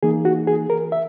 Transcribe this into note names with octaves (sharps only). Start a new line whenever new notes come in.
E3 A#3 D#4 G#4
F#4
G#4
A#4
E5